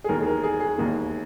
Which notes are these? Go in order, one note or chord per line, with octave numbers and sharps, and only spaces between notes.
G#4
E1 D#2 D#3 A#4
G#4
A#4
G#4
G#4
E1 D#2 D#3 A#3